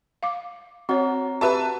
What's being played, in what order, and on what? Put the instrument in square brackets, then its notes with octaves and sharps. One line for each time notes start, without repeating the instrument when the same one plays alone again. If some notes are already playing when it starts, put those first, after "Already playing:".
[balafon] F5 D6
[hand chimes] C4 F#5 A#5 [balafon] F#4 C#5
[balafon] F#4 G4 B5 [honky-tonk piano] B4 E5 A5